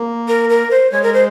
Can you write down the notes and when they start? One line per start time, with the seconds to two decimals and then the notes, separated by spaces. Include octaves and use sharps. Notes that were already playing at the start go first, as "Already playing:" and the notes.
Already playing: A#3
0.28 A#4
0.49 A#4
0.71 C5
0.91 G#3 C#5
1.03 A#4
1.14 C5